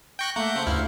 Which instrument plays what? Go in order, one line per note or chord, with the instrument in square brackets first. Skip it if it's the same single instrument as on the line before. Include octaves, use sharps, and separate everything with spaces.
[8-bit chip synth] G5 C#6 F#6 [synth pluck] G6 A#6
[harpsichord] A3 [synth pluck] A#3 [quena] E5 [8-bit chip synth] F#5 G6
[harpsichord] C#3 A3 C4
[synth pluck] D2 G2 F6 [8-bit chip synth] E4 [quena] F5